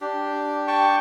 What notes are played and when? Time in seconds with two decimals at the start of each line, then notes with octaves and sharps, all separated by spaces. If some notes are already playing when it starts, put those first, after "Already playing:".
0.01 D4 G4
0.68 G5 A5 C#6